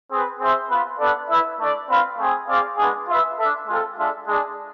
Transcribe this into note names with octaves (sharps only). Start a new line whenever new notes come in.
C4 G#4 B4
C4 G#4 C5 E5
B3 F4 B4
B3 D4 A4 D5
E4 B4 E5
A3 D4 A4 D5
C4 F4 B4 F5
A3 C4 G#4
C4 G#4 D5 F5
G#3 B3 D4 G#4
F4 B4 E5
D4 A4 E5
G#3 C4 F4 A4
G#3 D4 F4 A4 E5
G#3 D4 G#4